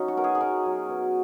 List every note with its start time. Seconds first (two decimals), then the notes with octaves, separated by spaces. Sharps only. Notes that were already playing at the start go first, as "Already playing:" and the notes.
Already playing: F#3 C#4 D#4
0.08 F#4
0.17 B2 A#4
0.24 G#4
0.35 G#4
0.41 B2 A#4
0.66 F#3
0.89 B2